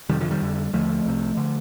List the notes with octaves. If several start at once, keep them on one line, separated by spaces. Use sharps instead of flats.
F2 C3 D#3 G3
D3 F3
D#3 G3
F2 D3
D#2 D3 F3 A3
C2 C3
D3